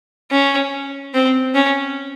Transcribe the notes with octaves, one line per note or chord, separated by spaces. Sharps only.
C#4
C4
C#4